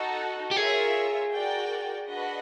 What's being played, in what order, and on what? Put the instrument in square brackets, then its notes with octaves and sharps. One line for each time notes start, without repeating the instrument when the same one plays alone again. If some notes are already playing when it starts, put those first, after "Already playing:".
Already playing: [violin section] D#4 F#4 A4
[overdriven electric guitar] G4
[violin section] F4 A#4 C#5 E5 [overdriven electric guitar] G#4
[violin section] F#4 A#4 D5 G5
D4 F#4 B4 D#5 F#5